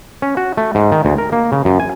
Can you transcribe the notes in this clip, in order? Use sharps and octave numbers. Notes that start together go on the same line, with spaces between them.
C#4
F#4
A3
G#2
D#3
D2
A#4
A#3
C#3
F#2
G#5